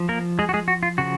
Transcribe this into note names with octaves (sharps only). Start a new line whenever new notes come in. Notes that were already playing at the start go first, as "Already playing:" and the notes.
Already playing: F3
A#3 A#4
G#3 G#4
F#4
G#3 G#4
F#4
F4
C#3 F3 F#4